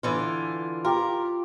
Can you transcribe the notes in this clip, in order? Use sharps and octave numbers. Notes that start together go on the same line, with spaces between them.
D3 E3 F4
F4 G4 A#4